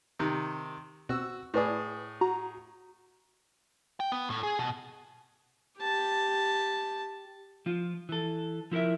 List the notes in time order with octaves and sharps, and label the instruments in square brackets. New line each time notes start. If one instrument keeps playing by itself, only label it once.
[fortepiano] C3 D#3
[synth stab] B2 C4 E6 [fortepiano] F#4
[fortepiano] A2 G#4 [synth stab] E4 B4 D5
[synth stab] F#4 A#5
[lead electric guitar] G5
B3
A2
G#4
B2
[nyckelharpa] G4 A5
[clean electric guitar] F3 F4
E3 A4
F3 E4 A4 A#4 E5